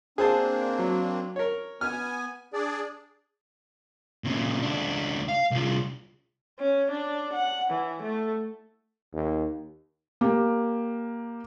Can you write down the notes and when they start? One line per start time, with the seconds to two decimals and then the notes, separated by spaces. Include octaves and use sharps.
0.18 A#3 C4 D4 G#4 C5 A5
0.79 F#3
1.36 A#4 C#5
1.81 B3 G#5 F6
2.53 D4 G#4 D5
4.24 A#2 C#3
4.62 C#2 D4
5.29 F5
5.51 C2 F4
6.59 C#4
6.91 D4
7.33 F#5
7.70 E3
8.02 A3
9.14 D#2
10.21 A#3 G4